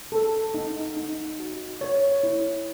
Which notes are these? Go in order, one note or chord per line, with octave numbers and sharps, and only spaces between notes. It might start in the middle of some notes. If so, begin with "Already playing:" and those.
A4
D#4
D#4
F#4
C#5
E4